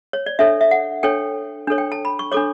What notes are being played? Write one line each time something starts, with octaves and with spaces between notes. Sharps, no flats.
C#5
D5
D4 A4 C#5 E5
E5
F#5
D4 A4 C#5 G5
D4 A4 C#5
G5
A5
B5
C#6
D4 A4 C#5 D6